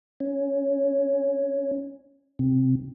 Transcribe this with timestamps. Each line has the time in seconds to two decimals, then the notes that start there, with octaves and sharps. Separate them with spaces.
0.20 C#4
2.39 C3